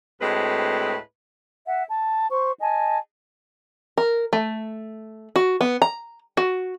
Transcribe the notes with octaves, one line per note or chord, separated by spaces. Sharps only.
D2 A2 G#3 C4 B4
E5 F#5
A5
C5 C#6
D#5 G#5 A5
A#4
A3
F#4
B3
A#5
F#4